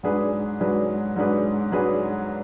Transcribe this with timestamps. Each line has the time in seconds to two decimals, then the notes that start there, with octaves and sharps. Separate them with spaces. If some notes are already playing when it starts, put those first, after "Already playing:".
0.03 G#2 F#3 D4 G#4 B4
0.60 G#2 F#3 D4 G#4 B4
1.16 G#2 F#3 D4 G#4 B4
1.72 G#2 F#3 D4 G#4 B4